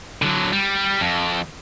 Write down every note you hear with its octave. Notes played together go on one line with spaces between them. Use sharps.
D3 F#3
G3
F2